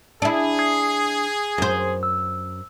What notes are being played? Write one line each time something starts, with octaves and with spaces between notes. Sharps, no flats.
D4 E4 G#4
D#6 G#6 C7
F#2 C5
E6